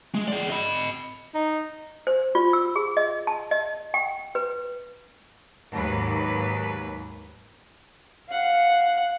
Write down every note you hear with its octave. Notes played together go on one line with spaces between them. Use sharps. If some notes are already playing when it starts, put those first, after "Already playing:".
G#3
G#4 D5
D#5 B5
D#4
C5
F4
E6
G#4
D#5
A5
D#5
G5
B4
D#2 G#2 F#3 B4
F5 F#5